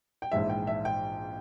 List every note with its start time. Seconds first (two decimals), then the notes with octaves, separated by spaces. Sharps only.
0.22 G5
0.32 A#1 G#2 E3 G#3 E5
0.49 G5
0.67 E5
0.85 G5